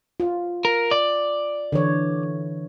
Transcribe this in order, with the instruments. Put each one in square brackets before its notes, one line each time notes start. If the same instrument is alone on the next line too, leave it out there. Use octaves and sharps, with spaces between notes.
[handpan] F4
[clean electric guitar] A#4
D5
[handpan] D3 E3 C#5